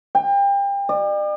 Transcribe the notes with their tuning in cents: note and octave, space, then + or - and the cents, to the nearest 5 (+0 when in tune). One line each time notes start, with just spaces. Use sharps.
G5 +30
D5 +45